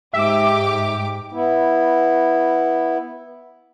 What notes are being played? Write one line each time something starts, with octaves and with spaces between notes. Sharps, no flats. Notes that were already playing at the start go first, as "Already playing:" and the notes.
G#2 G4 E5 D6
B3 E4